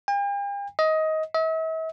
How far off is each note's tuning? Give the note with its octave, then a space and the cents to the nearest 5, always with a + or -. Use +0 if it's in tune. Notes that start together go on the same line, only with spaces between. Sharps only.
G5 +45
D#5 +20
E5 -45